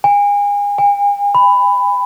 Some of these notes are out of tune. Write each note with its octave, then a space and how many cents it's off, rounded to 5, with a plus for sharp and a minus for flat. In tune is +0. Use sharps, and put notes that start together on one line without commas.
G#5 -35
G#5 -45
B5 +15